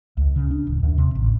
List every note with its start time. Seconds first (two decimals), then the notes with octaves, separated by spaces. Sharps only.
0.17 C#2
0.36 C#3
0.51 D4
0.67 D1
0.83 D#2
0.98 C3
1.15 A1